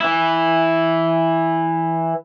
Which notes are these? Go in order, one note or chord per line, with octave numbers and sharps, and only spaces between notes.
E3 E4